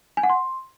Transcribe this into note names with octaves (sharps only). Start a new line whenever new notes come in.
G#5
F#5
C6